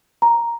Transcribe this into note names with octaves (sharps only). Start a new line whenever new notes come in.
A#5